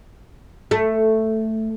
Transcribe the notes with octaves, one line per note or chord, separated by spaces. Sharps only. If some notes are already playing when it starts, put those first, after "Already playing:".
A3